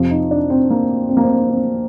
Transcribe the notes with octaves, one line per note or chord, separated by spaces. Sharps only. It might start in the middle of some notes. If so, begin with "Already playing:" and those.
Already playing: F2 C3 F3
D#4
D4
C4
A#3
C4
A#3
C4
C4